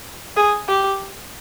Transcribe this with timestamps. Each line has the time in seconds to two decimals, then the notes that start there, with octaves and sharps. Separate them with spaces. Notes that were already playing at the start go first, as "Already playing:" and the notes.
0.36 G#4
0.68 G4